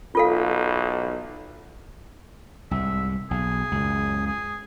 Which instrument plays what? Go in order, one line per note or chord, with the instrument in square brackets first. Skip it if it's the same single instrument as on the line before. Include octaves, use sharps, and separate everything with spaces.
[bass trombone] B1 [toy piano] F4 A4 F5
[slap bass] C2 G#2 [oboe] E5
[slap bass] B1 [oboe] G#4
[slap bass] C#2 F#2
[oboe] G#4